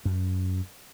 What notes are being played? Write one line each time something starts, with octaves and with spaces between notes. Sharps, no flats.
F#2